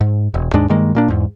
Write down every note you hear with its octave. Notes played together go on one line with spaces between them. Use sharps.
G#2
E1
D#2 G#2 G#3 D4
G2 D#3 G#3 A#3
A#2 A#3 D4
E2 G#2